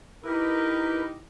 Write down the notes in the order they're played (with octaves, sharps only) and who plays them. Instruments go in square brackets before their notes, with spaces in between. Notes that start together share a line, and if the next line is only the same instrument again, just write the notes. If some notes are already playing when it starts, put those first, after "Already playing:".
[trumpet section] D#4 G4 [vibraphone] E4 [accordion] A#4 B4